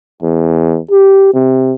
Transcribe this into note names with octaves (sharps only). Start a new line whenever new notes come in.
E2
G4
C3